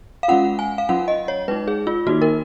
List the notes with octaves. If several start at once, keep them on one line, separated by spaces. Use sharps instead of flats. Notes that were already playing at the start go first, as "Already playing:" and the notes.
F5
G#3 C#4 F4 F#5
G#5
F5
F#3 C#4 F4 F#5
D#5
C#5
G#3 D#4 B4
G#4
F4
D#3 A#3 D#4 F#4
A#4